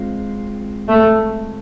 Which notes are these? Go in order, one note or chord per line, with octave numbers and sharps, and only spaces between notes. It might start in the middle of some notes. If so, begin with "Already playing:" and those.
Already playing: G#3 C4 F4
A3